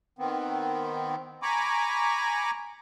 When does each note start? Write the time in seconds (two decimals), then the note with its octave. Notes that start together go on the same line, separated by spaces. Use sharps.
0.19 D#3 B3 C4
1.42 G#5 A#5 B5 C#6 D6